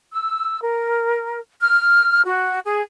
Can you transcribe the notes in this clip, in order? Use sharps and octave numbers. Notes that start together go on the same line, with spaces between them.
E6
A#4
F6
F#4
G#4